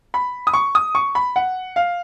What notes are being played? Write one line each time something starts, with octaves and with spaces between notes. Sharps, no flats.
B5
D#6
C#6
D#6
C#6
B5
F#5
F5